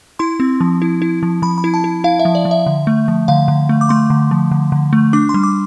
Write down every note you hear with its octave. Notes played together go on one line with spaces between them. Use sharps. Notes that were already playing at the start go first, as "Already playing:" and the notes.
E4 C6
C4
F3
E4
E4
F3
F3 B5
B5
E4
A5
E4
E4 F5
E5
F3
D5
F3
E5
D3
A3
F3
D3 F5
D3
A3
D6
A3 C6
D3
F3
D3
D3
A3
D4 D6
C6
G3
D6